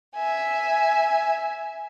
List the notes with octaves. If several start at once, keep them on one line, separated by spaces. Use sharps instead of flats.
E5 G#5